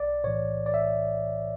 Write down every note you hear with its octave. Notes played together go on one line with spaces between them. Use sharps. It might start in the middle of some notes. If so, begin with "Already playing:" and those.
Already playing: B1 D5
A2 E3 C#5
D5
E5